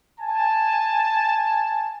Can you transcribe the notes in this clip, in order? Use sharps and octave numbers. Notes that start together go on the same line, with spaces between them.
G#5 A5